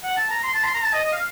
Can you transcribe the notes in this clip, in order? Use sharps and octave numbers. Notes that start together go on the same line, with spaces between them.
F#5
A5
A#5
C6
A5
C6
A#5
A5
D#5
D#5
F5